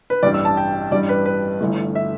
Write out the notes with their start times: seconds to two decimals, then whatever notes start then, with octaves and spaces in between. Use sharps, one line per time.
0.10 B4
0.23 A1 G2 G3 D5
0.34 E6
0.45 A5
0.57 G5
0.91 A1 G2 G3 D5
1.09 B4
1.26 B4
1.61 G1 G2 E3 A3
1.95 E5